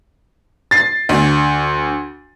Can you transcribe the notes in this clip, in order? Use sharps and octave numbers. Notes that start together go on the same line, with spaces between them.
A6 C7
D2